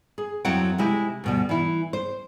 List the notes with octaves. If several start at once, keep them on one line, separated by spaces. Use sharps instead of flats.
G#4
F2 F#3 C4 E4 F#5 G5
C3 G#3 E4 G4
D2 B2 G3
E3 E4
C5